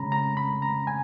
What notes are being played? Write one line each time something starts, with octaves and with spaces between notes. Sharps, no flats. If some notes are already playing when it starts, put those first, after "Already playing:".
Already playing: C#3 G#3 C#4 A#5 B5
A#5
B5
A#5
G#5